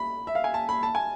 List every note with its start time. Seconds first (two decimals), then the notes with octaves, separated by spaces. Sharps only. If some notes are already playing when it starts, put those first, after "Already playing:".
Already playing: B5
0.27 E5
0.35 F5
0.44 G#5
0.54 A5
0.69 B5
0.83 A5
0.95 G#5